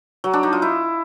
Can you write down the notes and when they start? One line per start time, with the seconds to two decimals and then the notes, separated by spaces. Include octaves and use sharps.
0.24 F#3
0.33 D4
0.43 D#4
0.53 F4
0.62 E4